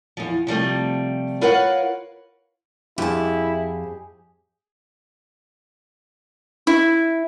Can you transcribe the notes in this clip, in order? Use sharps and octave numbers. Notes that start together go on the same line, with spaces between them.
E2 F3
C3 F3 G3 A3
F4 A#4 B4 C#5 F5 F#5
F2 E4 G4 G#4 A5
E4